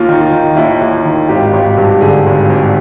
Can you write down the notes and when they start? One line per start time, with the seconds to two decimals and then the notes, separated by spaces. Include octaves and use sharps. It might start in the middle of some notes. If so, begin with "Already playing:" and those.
Already playing: D#2 F4
0.09 D#3
0.21 F4
0.32 D#3
0.56 D#2 E4
0.81 D#2
1.05 D#3
1.29 G#1 G4
1.53 G#1
1.77 G2
2.01 D3 G#4
2.26 G#1
2.49 G#1